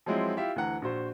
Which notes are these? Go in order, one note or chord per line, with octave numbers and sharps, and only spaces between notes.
F3 F#3 G#3 C4 E4
E4 F4 G4 E5
D2 E3 F#5 A#5
A#1 F#4 C5